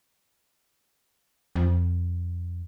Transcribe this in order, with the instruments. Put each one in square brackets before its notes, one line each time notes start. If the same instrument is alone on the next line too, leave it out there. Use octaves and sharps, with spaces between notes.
[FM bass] F2